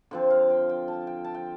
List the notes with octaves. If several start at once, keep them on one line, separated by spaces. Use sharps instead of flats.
D3 F3 C4
F5
G5
G5
A5
G5
A5
G5